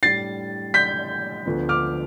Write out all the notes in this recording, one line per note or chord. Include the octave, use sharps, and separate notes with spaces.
A2 G3 D4 A6 C7
G6 B6
D2 D3 F3 B3
D6 F6